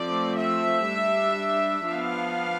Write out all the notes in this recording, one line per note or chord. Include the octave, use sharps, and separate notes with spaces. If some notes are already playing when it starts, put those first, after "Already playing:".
Already playing: F3 A3 C4 D5
E5
G3 D4
F3 B3 D4 F5